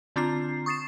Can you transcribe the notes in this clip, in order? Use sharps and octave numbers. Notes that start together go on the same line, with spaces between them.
D3 C4 D4 F4 A#5 C7
C#6 D#6 A6 C7 E7